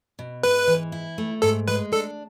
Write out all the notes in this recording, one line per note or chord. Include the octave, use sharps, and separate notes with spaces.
B2
G#2 B4
E3
E4
A3
G#2 A4
G#3 B4
D4 A4